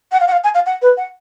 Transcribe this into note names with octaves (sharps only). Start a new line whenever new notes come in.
F#5
F5
F#5
F5
G#5
F5
F#5
B4
F#5